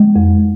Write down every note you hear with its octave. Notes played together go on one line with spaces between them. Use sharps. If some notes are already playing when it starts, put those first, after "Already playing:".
Already playing: G#3
F2